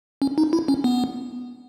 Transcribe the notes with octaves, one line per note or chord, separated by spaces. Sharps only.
C#4
D#4
E4
C#4
B3